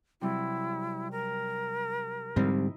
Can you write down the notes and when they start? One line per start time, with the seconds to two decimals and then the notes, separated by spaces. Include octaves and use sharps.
0.21 C3 F#3 G3 E4
1.12 A#4
2.36 G#2 D3 F3 G3 C4 D#4 E4